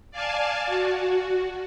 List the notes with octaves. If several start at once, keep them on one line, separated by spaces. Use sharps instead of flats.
D5 F5 G#5 A5
F#4